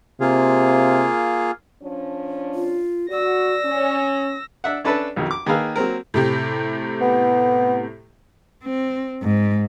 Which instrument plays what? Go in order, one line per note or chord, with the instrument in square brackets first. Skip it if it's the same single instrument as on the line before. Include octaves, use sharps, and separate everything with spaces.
[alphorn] C3 [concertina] A#3 F4 G#4
[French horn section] F3 C#4 D4
[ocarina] F4
[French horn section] F#4 [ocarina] D5 [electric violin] E6 A#6
[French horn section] C#4
[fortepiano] D4 E5 F#5
C#4 D4 A4 B4 E5 A5
B1 F2 D#3 F#3
D6
D#3 A#3 G#4 B4 F5 E6
F#3 A#3 C4 A#4
[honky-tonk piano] A2 C3 G4
[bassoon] B3
[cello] C4
G#2